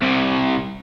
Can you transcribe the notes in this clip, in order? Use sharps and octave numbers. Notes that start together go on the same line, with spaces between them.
C2 C3